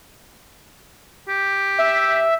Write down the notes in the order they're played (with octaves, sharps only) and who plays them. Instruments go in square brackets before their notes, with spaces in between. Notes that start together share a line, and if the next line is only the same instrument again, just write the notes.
[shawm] G4
[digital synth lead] E5